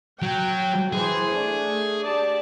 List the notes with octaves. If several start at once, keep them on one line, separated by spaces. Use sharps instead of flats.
F#3 G5
E3 G#4 C5
A3 D4
G4 D5 A5